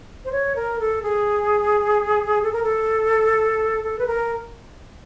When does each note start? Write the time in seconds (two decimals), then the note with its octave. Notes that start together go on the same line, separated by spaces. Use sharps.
0.25 C5
0.32 C#5
0.56 A#4
0.79 A4
1.03 G#4
2.43 A4
2.53 A#4
2.63 A4
3.84 A4
3.99 B4
4.07 A#4